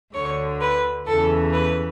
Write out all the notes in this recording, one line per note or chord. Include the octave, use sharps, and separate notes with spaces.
D2 D3 C#5
B4
E2 C#3 E3 A4
B4